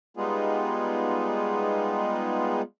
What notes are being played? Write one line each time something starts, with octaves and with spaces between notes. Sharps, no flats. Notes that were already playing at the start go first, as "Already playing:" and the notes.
G3 G#3 B3 D#4 F4 G#4